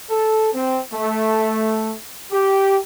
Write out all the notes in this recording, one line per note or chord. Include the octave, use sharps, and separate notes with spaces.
A4
C4
A3
G4